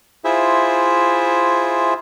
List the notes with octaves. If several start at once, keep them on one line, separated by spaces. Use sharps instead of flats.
E4 F4 G#4 C5 E5